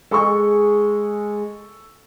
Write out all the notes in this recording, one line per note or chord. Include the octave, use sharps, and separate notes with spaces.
G#3 A4 C#6